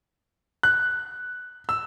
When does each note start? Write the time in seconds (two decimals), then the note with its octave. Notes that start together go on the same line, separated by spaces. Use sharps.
0.63 F#6
1.69 E6